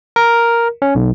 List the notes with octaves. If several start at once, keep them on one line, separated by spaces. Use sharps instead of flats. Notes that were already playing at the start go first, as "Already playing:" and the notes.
A#4
C#4
B1